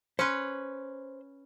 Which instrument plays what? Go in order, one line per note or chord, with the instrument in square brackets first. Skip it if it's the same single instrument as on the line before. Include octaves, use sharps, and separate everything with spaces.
[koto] C#4 B4 [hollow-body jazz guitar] C5 C6